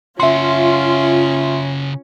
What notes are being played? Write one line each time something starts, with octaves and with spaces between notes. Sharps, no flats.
C#3 C#4 F4 F#4 E5 C6